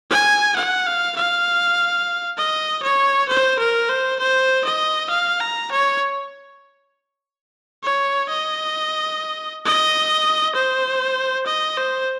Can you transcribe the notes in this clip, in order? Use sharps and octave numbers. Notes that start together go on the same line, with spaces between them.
G#5
F#5
F5
F5
D#5
C#5
C5
A#4
C5
C5
D#5
F5
A#5
C#5
C#5
D#5
D#5
C5
D#5
C5